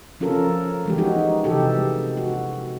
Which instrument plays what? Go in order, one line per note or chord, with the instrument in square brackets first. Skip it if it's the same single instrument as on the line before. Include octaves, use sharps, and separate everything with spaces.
[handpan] F3 C#4 F4 A4 A#4
E3 G#3 G4
D#4 F#4 G#4
C3 E3 G4 A4
G#3
F#4